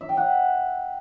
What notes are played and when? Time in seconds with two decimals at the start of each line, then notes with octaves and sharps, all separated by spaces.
0.01 E5
0.09 G5
0.17 F#5